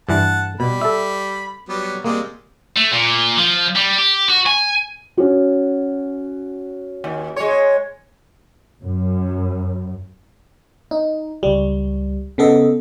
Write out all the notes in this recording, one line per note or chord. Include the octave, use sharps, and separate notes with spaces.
G2 E3 F#5 A5
B2 G3 B5
A4 E5
F#3 G3 B3
G3 G#3 A#3 C4
A3
A#2
F3
G3
G4
F#4
G#5
C#4 F#4
D#2
G#3 C#5
F#2
D#4
C#2 G3
C#3 B3 A4 D#5